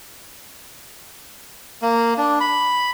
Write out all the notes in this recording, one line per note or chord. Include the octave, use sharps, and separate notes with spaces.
A#3
D4
B5